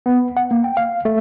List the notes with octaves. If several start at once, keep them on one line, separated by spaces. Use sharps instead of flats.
B3
F#5
A#3
G5
F5
A3